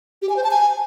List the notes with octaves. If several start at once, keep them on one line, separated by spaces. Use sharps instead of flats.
G4
G#5
C5
A5
G#5